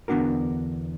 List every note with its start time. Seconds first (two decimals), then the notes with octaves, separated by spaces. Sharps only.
0.08 E2 D3 B3 D4 F#4 A#4